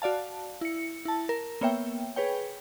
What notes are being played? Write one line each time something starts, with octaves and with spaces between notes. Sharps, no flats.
F#4 D5 F5 A5
E4 C#7
E4 A5
A#4
A#3 B3 C#5 E5 G5
G#4 B4 C#5 G5